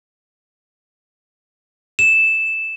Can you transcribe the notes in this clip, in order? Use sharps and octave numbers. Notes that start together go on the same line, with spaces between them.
E7